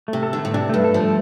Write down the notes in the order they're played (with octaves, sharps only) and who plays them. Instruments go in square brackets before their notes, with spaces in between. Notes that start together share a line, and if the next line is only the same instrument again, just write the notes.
[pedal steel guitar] A3
[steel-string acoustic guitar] C3
[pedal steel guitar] A4
[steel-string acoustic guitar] D3
[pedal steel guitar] A3
[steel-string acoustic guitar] A2
[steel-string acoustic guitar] C3 [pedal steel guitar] D4
[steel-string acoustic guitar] G2 [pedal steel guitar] A3
[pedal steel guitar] A4
[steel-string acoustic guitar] F3
[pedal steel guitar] A3